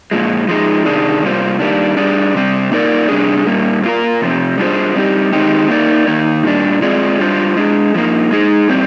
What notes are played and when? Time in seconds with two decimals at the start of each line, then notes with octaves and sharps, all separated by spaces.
0.11 A#2 F3 G#3
0.48 F3 G#3 D#4 G#4
0.85 C3 D#3 G3 D4 G#4
1.23 C3 G3 A#3 F4 C5
1.59 D#3 G3 A#3 D4
1.97 G3 D4 G#4 D5
2.34 C3 G3 C4
2.72 A#3 D#4 A#4 D5
3.09 C3 G3 D4 G#4
3.46 A#2 G3 A#3
3.84 A#3 F4 A#4
4.21 C3 F3 C4
4.58 G3 D4 F4 G#4 C5
4.96 G3 C4 D#4 G4
5.33 D#3 G#3 C4 D#4 G4
5.70 A#3 D#4 A#4 D5
6.07 D#3 A#3 D#4
6.45 A#2 G3 D4
6.82 G#3 C4 F4 G#4 D5
7.20 G3 D4 F4 C5
7.57 G#3 D4 G#4
7.94 D3 F3 A#3 D#4
8.31 G#3 D#4 G#4
8.69 A#2 G3 C4